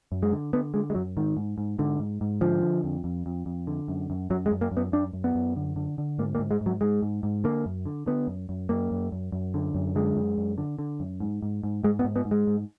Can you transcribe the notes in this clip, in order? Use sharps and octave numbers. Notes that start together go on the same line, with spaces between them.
F#2
G#3
D3
D3 B3
D3 G#3
G#3
F#2 F#3
G#2 D#3
G#2
G#2
G#2 D3
G#2
G#2
D3 F3
D3
F2
F2
F2
F2
D3
F#2
F#2
F#2 F#3
G#3
F#2
A#3
F#2
B3
F#2 D4
F#2
B3
F#2
D3
D3
D3
G#2 A#3
A#3
G#2
G#3
G#2
F#3
G#2 G#3
G#2
G#2
D3 A#3
F#2
D3
D3 B3
F#2
F#2
F#2 A#3
F#2
F#2
F#2
D3
F#2
D3 G#3
F#2
F#2
D3
D3
F#2
G#2
G#2
G#2
G#2 G#3
B3
G#2
B3
G#2
G#3
G#2